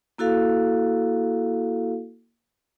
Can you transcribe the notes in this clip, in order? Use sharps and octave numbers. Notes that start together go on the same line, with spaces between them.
A#3 E4 F#4 A4 F5